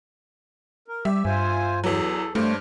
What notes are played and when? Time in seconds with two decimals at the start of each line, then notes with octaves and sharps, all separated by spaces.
0.88 A#4
1.05 G3 G4 E5
1.25 G2 F4 C5 G#5
1.84 E2 E3 F#3 A4
2.35 G2 A3 D4 C5 C#5